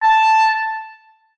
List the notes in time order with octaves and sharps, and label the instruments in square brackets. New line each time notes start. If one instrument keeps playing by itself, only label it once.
[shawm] A5